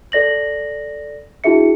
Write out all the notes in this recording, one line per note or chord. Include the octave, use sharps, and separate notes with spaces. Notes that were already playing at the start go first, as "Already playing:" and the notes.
A4 D5 A#6 F#7
D4 E4 F#4 G#4 E5 C#7